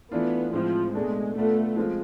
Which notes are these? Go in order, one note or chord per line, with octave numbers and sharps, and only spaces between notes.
E3 A3 B3 D4 F4
A2 F3 G#3 C4
B2 G#3 A3 D4
B2 A3 B3 D4 F4
F3 G#3 C4 F4